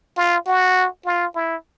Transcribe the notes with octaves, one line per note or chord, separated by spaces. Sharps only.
F4
F#4
F4
E4